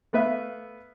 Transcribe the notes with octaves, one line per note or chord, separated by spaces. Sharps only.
A3 B3 B4 E5 F5